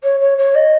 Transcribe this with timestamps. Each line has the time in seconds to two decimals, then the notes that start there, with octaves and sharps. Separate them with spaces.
0.03 C#5
0.20 C#5
0.37 C#5
0.54 D#5